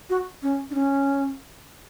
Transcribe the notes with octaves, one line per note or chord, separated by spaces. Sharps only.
F#4
C#4
D4
C#4